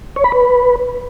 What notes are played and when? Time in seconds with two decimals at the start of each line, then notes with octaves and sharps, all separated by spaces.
0.16 C#5
0.24 B5
0.32 B4